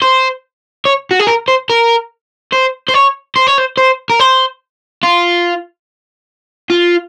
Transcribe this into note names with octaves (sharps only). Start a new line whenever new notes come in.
C5
C#5
F#4
G#4
A#4
C5
A#4
C5
C5
C#5
C5
C#5
C5
C5
A#4
C5
F4
F4